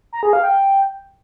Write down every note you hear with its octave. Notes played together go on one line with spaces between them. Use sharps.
A#5
G#4
F5
G5